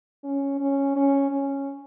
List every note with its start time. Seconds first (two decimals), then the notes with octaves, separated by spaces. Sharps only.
0.24 C#4
0.60 C#4
0.96 C#4
1.32 C#4